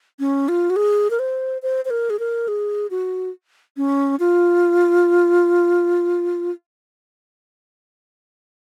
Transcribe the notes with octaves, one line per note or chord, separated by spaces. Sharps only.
C#4
F4
F#4
G#4
A#4
C5
C5
C5
A#4
G#4
A#4
G#4
F#4
C#4
F4